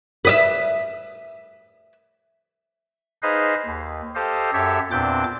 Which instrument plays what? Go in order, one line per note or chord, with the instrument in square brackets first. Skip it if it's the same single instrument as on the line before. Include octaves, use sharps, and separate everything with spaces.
[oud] B4 D#5 E5
[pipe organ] D#4 G#4 B4 C5 D#5 F5
D#2
G4 A4 C5 D#5 F5
F#2 G4 A4 C#5 E5
E2 A#2 C4 D4 D6 G6